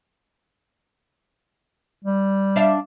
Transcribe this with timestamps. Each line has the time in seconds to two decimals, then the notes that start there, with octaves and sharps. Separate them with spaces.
2.04 G3
2.56 D4 E5 F5